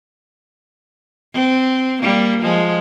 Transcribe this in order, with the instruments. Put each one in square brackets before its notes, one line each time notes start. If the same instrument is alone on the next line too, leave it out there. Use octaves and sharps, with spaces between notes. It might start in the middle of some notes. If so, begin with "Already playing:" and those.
[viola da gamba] C4
G3 A#3
F3 G#3